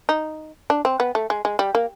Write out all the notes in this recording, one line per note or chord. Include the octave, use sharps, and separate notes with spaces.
D#4
D4
C4
B3
A3
G#3
G#3
G3
A#3